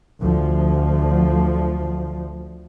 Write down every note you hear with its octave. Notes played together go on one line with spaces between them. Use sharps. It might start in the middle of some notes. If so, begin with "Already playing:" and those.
D2 F3